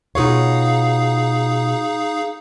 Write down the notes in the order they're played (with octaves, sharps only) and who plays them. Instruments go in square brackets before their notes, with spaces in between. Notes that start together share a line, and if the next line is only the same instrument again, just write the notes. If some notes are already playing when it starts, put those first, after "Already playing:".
[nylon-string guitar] B2 F4 C#5 [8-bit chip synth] D#4 G#4 F5